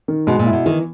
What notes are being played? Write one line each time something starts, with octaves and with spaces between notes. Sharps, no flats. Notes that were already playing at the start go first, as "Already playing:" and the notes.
D#3
B2 G#3
A#2
E4
B2
D#3 E3